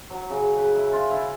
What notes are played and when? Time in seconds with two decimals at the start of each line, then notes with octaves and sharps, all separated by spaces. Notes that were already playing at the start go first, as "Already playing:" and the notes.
0.10 F#3
0.30 C#3
0.56 B4
0.75 E4
0.92 F4
1.11 E4